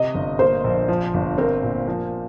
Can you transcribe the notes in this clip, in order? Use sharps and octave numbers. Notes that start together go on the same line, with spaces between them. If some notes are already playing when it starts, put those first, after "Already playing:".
Already playing: C3 D#5
G1
A#3 C5
A#1
F3
G1
C4 A#4
A#2
F3